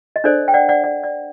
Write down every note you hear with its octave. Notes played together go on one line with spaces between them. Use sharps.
D#5
D4 A4 C5 D5
G5
D5 F#5
D5 F#5
D5
D5